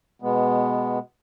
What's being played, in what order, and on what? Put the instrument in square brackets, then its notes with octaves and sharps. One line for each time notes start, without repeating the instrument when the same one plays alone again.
[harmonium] B2 G#3 B3